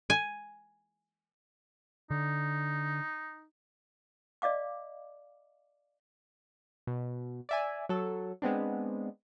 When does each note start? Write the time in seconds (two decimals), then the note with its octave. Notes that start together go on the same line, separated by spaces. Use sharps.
0.10 G#5
2.11 D3 D#4
4.42 D5 D#5 F5 D6
6.87 B2
7.49 D5 E5 G#5
7.89 F#3 A4
8.42 G#3 B3 C4 D4